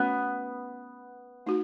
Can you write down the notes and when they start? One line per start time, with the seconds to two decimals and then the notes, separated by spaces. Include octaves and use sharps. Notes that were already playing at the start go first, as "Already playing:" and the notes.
Already playing: A3 B3 C#4 F#4 C#5
1.46 A3 D#4 F#4